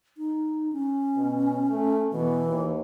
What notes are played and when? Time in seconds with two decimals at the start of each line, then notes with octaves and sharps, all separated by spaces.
0.17 D#4
0.73 C#4
1.16 B2
1.70 A3
2.12 B2 E3
2.46 D#2